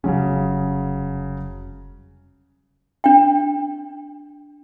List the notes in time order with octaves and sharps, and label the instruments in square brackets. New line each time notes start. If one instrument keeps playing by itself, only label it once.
[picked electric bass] F1 G3 C#4 [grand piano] C#3 F#3 G#4
[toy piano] D4 G5